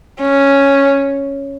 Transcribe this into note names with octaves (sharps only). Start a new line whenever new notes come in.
C#4